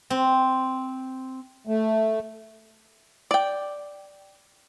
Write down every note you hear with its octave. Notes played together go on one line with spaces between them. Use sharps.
C4
A3
D5 G5